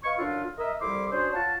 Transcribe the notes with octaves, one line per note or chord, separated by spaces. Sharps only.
B4 D#5 F5 C#6
F#2 D3 D4 E4 F4
A#4 D#5 E5
C2 F2 G3 E4 C6 D6
C#4 D4 F#4 G#4 C5
F4 C#5 F5 F#5 A5